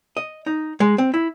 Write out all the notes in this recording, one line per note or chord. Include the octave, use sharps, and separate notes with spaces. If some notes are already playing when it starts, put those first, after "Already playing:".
D#5
D#4
G#3
C4
E4